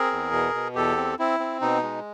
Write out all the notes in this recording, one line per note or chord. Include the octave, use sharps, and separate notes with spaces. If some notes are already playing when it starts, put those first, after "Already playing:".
Already playing: C4 G#4 A#4
E2
B2
B2
E2 G4 A4
C4
C4 E4
C4
B2 D#4
G#3